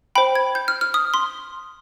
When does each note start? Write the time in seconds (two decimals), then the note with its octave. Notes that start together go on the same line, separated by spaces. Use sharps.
0.15 C5 G5 B5
0.35 G#6
0.55 G6
0.68 F6
0.81 F6
0.94 D#6
1.14 C6